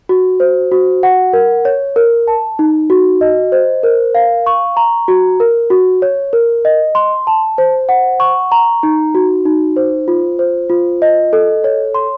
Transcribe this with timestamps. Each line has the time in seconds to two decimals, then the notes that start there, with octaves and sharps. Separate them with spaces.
0.09 F#4
0.40 C5
0.72 F#4
1.03 F#5
1.33 A#4
1.65 C#5
1.96 A#4
2.28 A5
2.59 D#4
2.90 F#4
3.21 D#5
3.52 C5
3.83 A#4
4.15 F5
4.46 C#6
4.77 A#5
5.08 F#4
5.40 A#4
5.70 F#4
6.02 C#5
6.33 A#4
6.65 D#5
6.95 C6
7.27 A5
7.58 C5
7.89 F#5
8.20 C#6
8.52 A#5
8.83 D#4
9.15 F#4
9.45 D#4
9.76 C5
10.08 F4
10.39 C5
10.70 F4
11.02 D#5
11.33 A4
11.64 C#5
11.95 C6